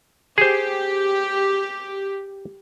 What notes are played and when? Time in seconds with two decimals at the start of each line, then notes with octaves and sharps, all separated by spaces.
0.38 G4 G#4 C5